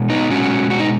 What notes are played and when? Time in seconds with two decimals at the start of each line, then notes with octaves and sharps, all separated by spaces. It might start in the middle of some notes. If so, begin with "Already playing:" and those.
Already playing: B2 G#3
0.10 B3 D#4
0.30 B2 G#3 C#4 F#4
0.70 F#4
0.80 D#4